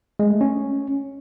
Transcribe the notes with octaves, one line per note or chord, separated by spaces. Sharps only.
G#3
A3
C#4